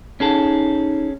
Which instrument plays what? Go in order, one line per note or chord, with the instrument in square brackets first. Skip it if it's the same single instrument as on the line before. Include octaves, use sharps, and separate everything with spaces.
[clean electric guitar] C#4 G#4 A4 [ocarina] D#4